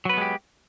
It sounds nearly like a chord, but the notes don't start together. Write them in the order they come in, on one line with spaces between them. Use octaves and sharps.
F#3 B4 B3 G#3 G4